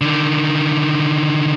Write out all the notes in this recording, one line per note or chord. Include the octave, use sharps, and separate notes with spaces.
D3 D#3